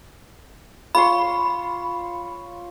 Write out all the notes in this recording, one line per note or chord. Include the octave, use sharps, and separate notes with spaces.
F4 C#5 B5 C6